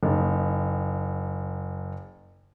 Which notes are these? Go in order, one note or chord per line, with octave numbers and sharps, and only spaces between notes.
F#1 D#4